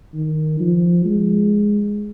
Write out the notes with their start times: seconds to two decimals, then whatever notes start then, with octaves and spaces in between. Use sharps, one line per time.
0.14 D#3
0.60 F3
1.05 G#3